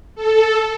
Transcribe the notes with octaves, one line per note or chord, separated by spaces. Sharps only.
A4